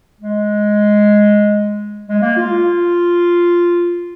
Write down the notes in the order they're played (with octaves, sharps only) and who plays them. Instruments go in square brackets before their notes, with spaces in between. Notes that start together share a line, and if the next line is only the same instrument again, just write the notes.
[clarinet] G#3
G#3
A#3
F4